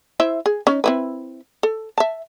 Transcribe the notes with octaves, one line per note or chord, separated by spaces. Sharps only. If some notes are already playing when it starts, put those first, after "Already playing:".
E4 C5 E5
G#4
C#4 D#4
C4 E4 B4
A4
E5 A5